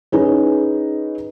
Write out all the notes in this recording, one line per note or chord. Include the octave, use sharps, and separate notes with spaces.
C#4 D#4 G#4 B4